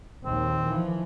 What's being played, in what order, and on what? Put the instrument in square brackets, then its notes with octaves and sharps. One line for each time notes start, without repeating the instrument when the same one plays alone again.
[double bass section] A#1 D#2 [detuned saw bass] D#3 [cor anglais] C4
[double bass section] E3 F3